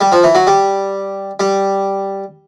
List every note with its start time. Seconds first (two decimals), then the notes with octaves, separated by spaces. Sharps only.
0.01 G3
0.12 F3
0.23 E3
0.35 F#3
0.47 G3
1.40 G3